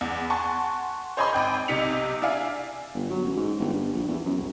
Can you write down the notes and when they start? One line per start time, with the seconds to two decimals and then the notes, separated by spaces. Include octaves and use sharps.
0.01 E2
0.30 F#5 G#5 A5 C6 C#6
1.17 C5 C#5 D#5 G#5 B5 C6
1.33 G#1 G5 G6
1.68 B1 C3 D#4 B6 C#7 F7
2.22 D4 E4 D5 E5 F5 G#5
2.95 G1
3.10 F#3
3.24 A1
3.36 G#2
3.59 G1
3.73 G2
3.93 A#1
4.08 E2
4.24 F#2
4.37 C2